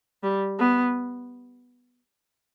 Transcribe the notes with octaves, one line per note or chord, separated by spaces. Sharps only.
G3
B3